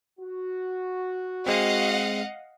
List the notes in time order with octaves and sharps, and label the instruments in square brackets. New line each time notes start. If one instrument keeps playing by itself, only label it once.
[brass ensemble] F#4
[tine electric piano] G#3 C4 [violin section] D#5 F5 F#5